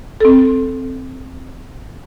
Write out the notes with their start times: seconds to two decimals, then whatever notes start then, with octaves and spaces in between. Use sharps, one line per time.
0.20 C4 A4